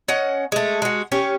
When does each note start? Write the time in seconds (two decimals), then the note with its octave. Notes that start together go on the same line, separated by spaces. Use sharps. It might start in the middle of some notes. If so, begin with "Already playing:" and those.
0.08 C#4 D#5 F#5
0.52 G#3 A3
0.82 G#3 F#4
1.12 C#4 G4 C#5